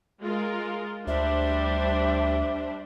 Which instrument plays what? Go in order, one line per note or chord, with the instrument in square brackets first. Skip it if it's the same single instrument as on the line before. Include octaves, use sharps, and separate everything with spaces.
[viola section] G#3 F4 A#4
[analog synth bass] D2 [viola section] G3 D4 C5 [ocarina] E5